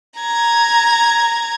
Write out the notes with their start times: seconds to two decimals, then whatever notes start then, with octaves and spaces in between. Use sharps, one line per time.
0.20 A#5 G#6